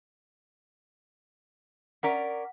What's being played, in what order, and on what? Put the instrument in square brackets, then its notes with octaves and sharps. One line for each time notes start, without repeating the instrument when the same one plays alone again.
[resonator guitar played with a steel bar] C#4 A#4 D5 [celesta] F#5 B6